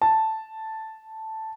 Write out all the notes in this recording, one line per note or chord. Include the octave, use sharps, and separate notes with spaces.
A5